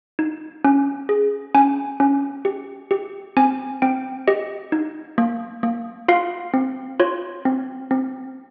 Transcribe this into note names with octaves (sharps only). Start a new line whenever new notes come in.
D#4
C#4
G#4
C#4 G#5
C#4
G4
G4
C4 G#5
C4 G5
G4 D#5
D#4
A#3
A#3
F4 F5
C4
F4 C#5
C4
C4